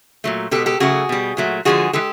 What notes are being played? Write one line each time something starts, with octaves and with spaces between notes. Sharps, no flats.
A#2 F#3 A3
B2 G#3 G4 A4
G4 A4
C#3 F#3 A3 F#4 G#4
B2 G3
A#2 F#3 A3
D3 F3 G#3 F#4 G#4
E3 G#3 G4 A4